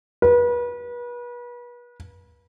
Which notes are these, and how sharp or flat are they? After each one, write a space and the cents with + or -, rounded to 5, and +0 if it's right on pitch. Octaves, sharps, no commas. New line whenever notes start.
B4 -35